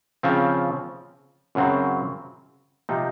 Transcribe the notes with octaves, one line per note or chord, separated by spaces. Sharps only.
C#3 F3 C4
F#2 C#3 F#3 C4
C3 F3 C4 D#4